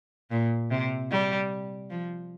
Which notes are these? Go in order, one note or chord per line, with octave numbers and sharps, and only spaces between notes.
A#2
C3
G3
F3